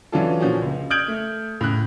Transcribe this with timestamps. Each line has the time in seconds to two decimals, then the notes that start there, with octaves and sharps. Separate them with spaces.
0.12 E3 F#3 C#4 D4 F4 A4
0.40 A#2 D3 F3 C#4 F#4
0.62 C#2
0.90 D#6 F6 G6 G#6 D7 F#7
1.08 A3
1.61 A2 C#3 F#6